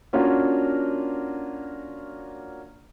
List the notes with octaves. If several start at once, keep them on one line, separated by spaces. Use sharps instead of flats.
A#3 C#4 D4 F4 F#4